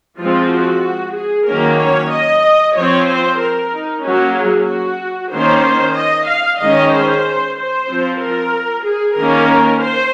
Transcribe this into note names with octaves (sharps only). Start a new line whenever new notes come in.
F3 G#3 C4 F4
F#4
G#4
D#3 F#3 A#3 C#4 A#4
C#5
D#5
F3 C4 C#5
C5
A#4
D#4
F#3 A#3 C#4 F#4
G#4
F#4
D#3 A#3 C#4 C5
D#5
F5
D#3 G#3 C#4 D#5
C5
C5
F3 C4
A#4
G#4
D#3 A#3 C#4 A#4
C5